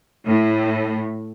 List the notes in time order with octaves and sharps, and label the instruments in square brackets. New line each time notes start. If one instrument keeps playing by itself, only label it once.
[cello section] A2